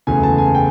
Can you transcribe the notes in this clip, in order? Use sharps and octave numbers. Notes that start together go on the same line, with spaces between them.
F#1 E2 C#3 F#3 A3 G#5
A5
G#5
G5